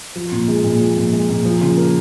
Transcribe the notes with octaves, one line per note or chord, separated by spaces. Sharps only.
F3
A#2
G#3
A#2
F3
A#2
G#3
A#2
F3
C#3
A#3